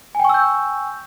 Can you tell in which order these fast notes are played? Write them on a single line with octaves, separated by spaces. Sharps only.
G#5 G5 C#6 E6 G6